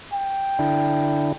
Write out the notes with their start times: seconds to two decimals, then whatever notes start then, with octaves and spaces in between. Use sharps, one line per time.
0.14 G5
0.59 D3 D4 E4